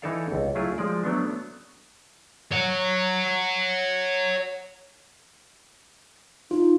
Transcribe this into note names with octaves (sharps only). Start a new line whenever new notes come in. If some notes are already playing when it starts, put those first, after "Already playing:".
E3 D#4 E4 A4 D5 F5
C#2
F#3 A3 E4 F4 G#4
F3 G#3 D5
F#3 A3 B3 D4
C#5 F#5
D#4 F4